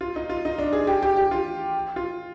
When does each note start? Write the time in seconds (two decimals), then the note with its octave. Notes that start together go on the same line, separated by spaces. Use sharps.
0.01 F4
0.16 D#4
0.29 F4
0.45 D#4
0.59 D4
0.73 G#4
0.87 G4
1.03 G4
1.17 G4
1.31 F4
1.96 F4